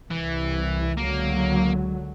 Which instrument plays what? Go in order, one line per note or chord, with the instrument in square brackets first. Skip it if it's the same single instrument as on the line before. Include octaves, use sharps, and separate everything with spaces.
[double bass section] C2 [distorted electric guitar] E3
[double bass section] C#2 D3 F#3 [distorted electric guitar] A#3